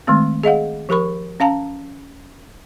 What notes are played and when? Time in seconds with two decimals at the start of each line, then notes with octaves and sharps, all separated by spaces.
0.07 D#3 G#3 A3 C4
0.44 G#4 D#5 F5 F#5
0.89 F3 G4 A#4 B5 C#6
1.40 C#4 F5 A5 A#5